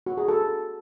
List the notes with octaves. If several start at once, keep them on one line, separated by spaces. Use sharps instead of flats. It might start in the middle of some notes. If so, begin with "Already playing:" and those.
F#4
G#4
A4